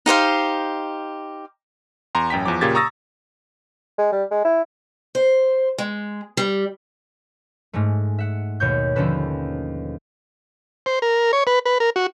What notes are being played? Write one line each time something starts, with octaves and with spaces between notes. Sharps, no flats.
D#4 G4 C5 F5
E2 A#5 C6
A1 F#2 G5 A#5 B6
E2 F3 D6
A#2 C#3 A#3 G4 G#6 A6
A#5 C#6 D#6 E6 A6 A#6
G#3
G3
G#3
E4
C5
G#3
G3
G#2 G#3 A3
E5 F#5
D#2 B2 C#5 G6
D#2 D3 F3 C#4 A4 B4
C5
A#4
C#5
B4
B4
A#4
F#4